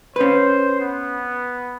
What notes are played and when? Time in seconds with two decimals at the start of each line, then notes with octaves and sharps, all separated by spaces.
0.16 C#4 B4 C5
0.81 B3